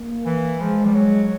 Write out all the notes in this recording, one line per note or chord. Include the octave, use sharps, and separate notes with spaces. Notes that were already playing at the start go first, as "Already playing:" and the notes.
Already playing: A#3
E3
F3 G#3
G3
F#3